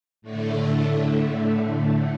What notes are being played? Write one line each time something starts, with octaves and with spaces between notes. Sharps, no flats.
A2 D3 A3